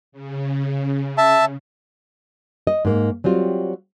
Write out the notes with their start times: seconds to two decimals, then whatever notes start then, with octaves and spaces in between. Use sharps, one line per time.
0.12 C#3
1.18 E5 A5
2.67 D#5
2.85 G#2 A#3
3.24 F#3 G3 C4 F4